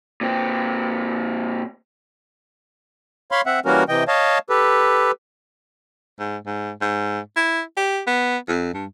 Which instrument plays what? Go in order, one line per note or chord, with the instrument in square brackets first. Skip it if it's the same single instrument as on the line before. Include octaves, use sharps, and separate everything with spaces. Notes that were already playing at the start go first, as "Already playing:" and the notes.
[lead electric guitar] A#2 C4
[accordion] C#5 F5 B5 C6
C4 E5 F#5
E3 G3 A#3 C#4 F#4 A#4
C3 E3 D#5 G5
C#5 D#5 F5 A5
G4 A4 B4
[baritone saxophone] G#2
G#2
G#2
E4
G4
B3
F2
G2